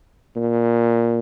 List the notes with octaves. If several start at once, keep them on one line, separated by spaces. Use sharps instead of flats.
A#2